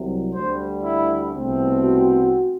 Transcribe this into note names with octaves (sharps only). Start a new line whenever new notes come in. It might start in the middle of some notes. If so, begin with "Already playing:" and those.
Already playing: C2 C3 F#3
D2 D3 G3 C5
E4
C2 B2 A3 C4
F#4